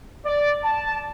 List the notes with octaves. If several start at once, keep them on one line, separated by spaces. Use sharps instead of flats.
D5
A5